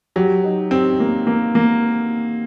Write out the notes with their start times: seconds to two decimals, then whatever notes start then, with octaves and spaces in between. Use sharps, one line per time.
0.16 F#3 G4
0.44 D#4
0.71 C4 G4
1.00 A#3
1.27 A#3
1.55 A#3